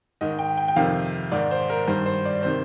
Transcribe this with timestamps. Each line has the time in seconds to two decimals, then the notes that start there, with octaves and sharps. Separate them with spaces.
0.21 G#2 D#3 D#5
0.39 G5
0.57 G5
0.68 G5
0.76 F2 C3 D#3 F5
1.32 G#2 D#3 D5
1.51 C5
1.70 A#4
1.88 G2 D#3 C5
2.06 C5
2.25 D5
2.43 C3 D#3 C5